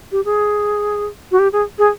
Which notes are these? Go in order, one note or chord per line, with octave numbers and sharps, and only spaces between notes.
G4
G#4
F#4
G4
G#4
G#4